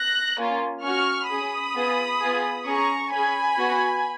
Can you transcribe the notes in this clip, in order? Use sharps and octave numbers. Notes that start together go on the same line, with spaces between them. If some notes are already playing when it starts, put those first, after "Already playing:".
Already playing: F#6 A#6
A#3 C#4 F4
C#4 F#4 C#6 F6
C#4 G#4 B5 D#6
B3 F4 G#4
B3 F4 G#4
C#4 G#4 A#5 C#6
C#4 G#4 G#5 B5
B3 F#4